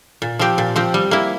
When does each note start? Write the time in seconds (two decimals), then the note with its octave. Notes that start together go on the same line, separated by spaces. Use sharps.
0.22 A#2
0.39 F3 C4 G4
0.58 A#2
0.76 F3 C4 G4
0.94 G3
1.11 A#3 E4